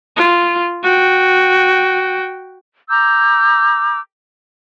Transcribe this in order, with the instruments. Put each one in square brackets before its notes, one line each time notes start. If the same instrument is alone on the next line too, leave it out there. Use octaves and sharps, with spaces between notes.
[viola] F4
F#4 G5
[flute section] A#5 D6 E6 G6